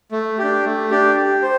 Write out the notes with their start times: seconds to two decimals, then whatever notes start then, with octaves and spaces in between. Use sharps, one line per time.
0.12 A3
0.39 D4 G4
0.65 A3
0.91 D4 G4
1.17 G4
1.42 C5